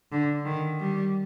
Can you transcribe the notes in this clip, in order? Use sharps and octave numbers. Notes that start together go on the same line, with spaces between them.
D3
D#3
G3